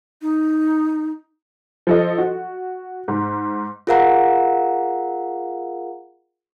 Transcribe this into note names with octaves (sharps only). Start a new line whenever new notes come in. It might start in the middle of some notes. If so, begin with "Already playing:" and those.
D#4
F3 A4 D#5
F#4
G#2
F4 G#4 A#4 F5 F#5 A#5